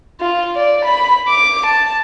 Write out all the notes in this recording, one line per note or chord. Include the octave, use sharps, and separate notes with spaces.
F4
D5
B5
D6
A5